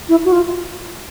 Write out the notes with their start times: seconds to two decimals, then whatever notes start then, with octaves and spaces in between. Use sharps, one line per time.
0.09 E4
0.25 F#4
0.32 F4